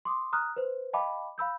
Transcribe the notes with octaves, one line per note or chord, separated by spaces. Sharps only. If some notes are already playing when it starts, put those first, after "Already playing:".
C6 D6 D#6
A#5 D#6 F6 F#6
B4 C5
D#5 F5 G5 A5 B5 D6
F5 B5 E6 G6